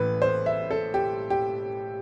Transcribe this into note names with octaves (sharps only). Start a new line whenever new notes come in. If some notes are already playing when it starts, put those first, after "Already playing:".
Already playing: A1 A2 E3 B4
C5
E5
A4
G4
G4